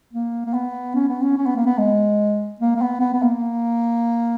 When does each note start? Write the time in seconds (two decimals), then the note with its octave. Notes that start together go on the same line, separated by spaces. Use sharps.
0.13 A#3
0.46 A#3
0.53 B3
0.95 C#4
1.09 B3
1.22 C#4
1.37 C#4
1.46 B3
1.56 A#3
1.66 B3
1.78 G#3
2.60 A#3
2.76 A#3
2.81 B3
3.00 B3
3.13 B3
3.22 A#3